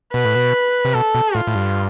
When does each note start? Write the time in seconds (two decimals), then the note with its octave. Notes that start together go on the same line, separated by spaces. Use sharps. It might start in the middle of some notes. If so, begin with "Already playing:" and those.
0.14 B2 B4
0.25 A2
0.35 B2
0.85 C3
0.95 B2 A4
1.15 B2
1.35 A2 F4
1.47 A2
1.55 G2